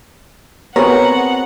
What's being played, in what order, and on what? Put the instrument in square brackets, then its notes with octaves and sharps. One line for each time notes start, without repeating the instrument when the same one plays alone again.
[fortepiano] B3 F#4 G#4 [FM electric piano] C4 C5 C#5 [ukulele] A#4 [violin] F#5